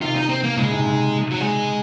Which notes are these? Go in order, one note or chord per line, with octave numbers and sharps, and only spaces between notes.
C3 D#3 F4
D#4
C4
A#3
A#2 C#3 G#3
G#2 C3
G#2 C3
F#3
G#3